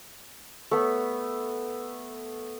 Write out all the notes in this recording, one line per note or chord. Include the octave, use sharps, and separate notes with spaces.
A3 B3